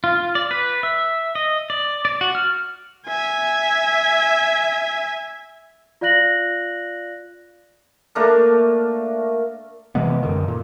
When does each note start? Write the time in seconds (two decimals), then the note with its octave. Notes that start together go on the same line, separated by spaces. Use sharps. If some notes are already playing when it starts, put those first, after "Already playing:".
0.04 F4
0.35 D5
0.51 B4
0.83 E5
1.35 D#5
1.70 D5
2.05 D5
2.21 F#4
2.35 F6
3.07 E5 G#5
6.01 F4 D5 F5 F#6 A#6 F#7
8.15 A3 A#3 D4 A#4
9.95 C3 E3 G#3 B3
10.23 F#2 D3 D#3
10.48 A#2